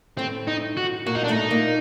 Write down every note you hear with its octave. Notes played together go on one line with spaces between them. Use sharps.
A2 A3 C4
D#4
F#4
A#2 A#3 F#4
D#4
D4
A2 A3 D#4
A#2 A#3